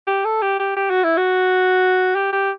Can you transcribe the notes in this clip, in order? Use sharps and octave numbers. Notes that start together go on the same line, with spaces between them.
G4
A4
G4
G4
G4
F#4
E4
F#4
G4
G4